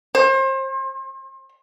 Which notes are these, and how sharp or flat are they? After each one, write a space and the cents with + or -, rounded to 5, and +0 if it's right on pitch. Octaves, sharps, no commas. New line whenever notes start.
C5 +35